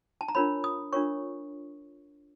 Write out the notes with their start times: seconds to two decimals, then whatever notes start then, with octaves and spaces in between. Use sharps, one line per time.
0.21 A5
0.28 A#5
0.35 D4 F4 A#4 C#5 B5
0.64 D#6
0.93 D4 F4 A#4 C#5 C#6